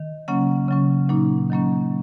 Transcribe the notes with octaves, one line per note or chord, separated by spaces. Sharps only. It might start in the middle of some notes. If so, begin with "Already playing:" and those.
Already playing: D#3
C#3 F#3 A#3 C#4 F#5
C#3 F#3 C#4
A#2 F#3 A#3 D#4
D#3 F#3 A#3 C#4